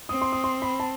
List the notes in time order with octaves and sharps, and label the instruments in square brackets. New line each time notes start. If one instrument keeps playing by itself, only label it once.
[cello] C4 [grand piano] D#6
[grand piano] C6
D#6
C6
B5
A5